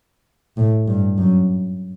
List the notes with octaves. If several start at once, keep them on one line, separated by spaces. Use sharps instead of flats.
A2
G2
F#2